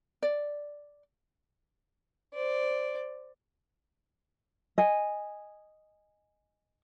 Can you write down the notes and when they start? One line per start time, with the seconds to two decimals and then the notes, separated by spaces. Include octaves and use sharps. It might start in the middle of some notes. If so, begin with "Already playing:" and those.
0.23 D5
2.34 C5 D5
4.78 D#5 G#5